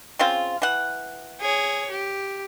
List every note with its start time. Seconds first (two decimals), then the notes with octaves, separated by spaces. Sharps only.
0.19 C#3 C4 F4
0.62 E3 F#5
1.40 G#4 C#5
1.91 G4